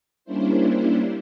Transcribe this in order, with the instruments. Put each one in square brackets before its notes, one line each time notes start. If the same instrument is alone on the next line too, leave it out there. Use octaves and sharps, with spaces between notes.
[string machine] G3 A#3 C#4 D4 E4 C5